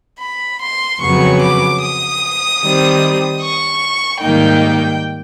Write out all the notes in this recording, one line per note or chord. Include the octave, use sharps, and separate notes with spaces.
B5
C6
F2 C#3 F#3 B3 C#6
D6
D#6
D#3 G3 C4
C#6
G#2 D#3 G3 A#3 D#4 G5